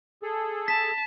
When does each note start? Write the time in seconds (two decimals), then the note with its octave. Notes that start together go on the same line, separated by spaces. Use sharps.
0.23 G#4 A4
0.68 A5 B6